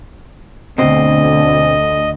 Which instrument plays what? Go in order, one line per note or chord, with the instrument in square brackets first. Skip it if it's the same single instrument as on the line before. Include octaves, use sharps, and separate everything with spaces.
[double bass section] D2 D3 [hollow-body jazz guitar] B2 C4 [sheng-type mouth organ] D#5